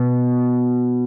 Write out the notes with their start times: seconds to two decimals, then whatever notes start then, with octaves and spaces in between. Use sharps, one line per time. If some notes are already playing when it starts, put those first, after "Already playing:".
Already playing: B2